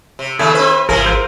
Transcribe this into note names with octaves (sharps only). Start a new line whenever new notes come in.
C3
D#2 C#3 A3 G#4 E5
C4 B4
G#1 C3 E3 G#4 A#4
F4 A#4 C5